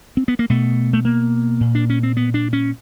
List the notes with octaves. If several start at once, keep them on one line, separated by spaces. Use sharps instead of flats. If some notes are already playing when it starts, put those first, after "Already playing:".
C4
B3
A#3
B2 A3
A3
A#3
A#2
D4
C#4
C4
B3
D4
C#4